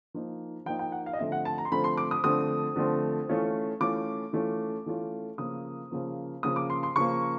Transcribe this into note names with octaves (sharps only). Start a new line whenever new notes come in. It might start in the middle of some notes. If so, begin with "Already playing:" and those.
F3 A#3 D#4
F3 A#3 D#4 G5
G5
F#5
F5
D#5
D3 F3 A3 C4 E5
F#5
A5
A#5
C6
D3 F3 A3 C4 B5
C6
D6
D#6
D3 F3 A3 C4 D#6
D3 F3 A3 C4
E3 A3 C#4 F4
E3 A3 C#4 F4 D6
E3 A3 C#4 F4
E3 A3 C#4 F4
C#3 F3 A#3 D#6
C#3 F3 A#3
C#3 F3 A#3 D#6
D6
C6
C6
C#3 F3 A#3 C#6